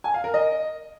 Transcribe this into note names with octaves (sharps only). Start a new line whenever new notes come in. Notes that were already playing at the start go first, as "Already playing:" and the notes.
G#5
F5
A#4
D#5